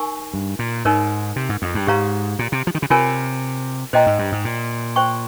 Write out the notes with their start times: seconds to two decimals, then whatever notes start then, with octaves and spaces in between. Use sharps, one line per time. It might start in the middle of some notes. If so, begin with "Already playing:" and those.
Already playing: D#4 A#4 G#5 C#6
0.33 G2
0.59 A#2
0.85 G#2 D#4 A#4 C#5
1.36 C3
1.49 G#2
1.62 F2
1.74 G2
1.87 G#2 G4 C#5 F5 A#5
2.39 A#2
2.52 C3
2.67 F3
2.75 D#3
2.82 C#3
2.90 C3 F4 A#4 C#5 G#5
3.93 A#2 C5 D#5 G5 A#5
4.06 G#2
4.19 G2
4.32 G#2
4.45 A#2
4.96 C5 G5 C#6